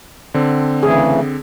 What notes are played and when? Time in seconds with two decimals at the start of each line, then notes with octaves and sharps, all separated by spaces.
0.34 D3 C4
0.83 C#3 E3 A3 G#4